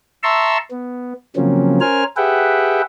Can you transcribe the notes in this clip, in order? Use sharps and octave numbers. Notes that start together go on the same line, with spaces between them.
E5 A5 A#5 C6 C#6 E6
B3
C#3 F3 F#3 A#3 C4 C#4
C#4 A#4 C5 G#5 F6
G4 G#4 B4 E5 F#5 G5